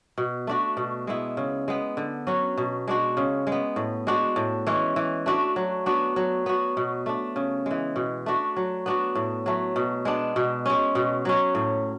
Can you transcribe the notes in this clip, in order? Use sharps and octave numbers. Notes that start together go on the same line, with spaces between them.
B2
A3 D4 F#4
B2
G#3 B3 E4
C#3
G#3 B3
D3
F#3 C#4 F#4
B2
G#3 D4 F#4
C#3
G#3
B3
A2
G#3 D4 F#4
A2
E3 G#3 C#4
E3
A3 D4 F#4
F#3
B3 D4 F#4
F#3
B3 F#4
B2
A3 D4
C#3
E3 G#3
B2
A3 D4 F#4
F#3
B3 D4 F#4
A2
F#3 A3
B2
G#3 B3 D4
B2
G#3 C#4
B2
F#3 C#4
A2